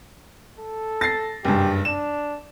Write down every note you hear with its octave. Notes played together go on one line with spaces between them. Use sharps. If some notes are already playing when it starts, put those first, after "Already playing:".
A4
A6 A#6 C7
F#1 G2 G4
D4 E7